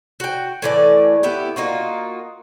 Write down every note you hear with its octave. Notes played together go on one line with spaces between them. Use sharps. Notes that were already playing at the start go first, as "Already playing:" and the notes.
F#4 G5
A2 E3 D5 G#5
B3 E4 G4
A#3 D#4 F4 F#4